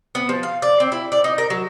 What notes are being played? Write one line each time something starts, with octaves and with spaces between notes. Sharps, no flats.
B3
F3
F5
D5
C4
E4
D5
D#4
A#4
F#3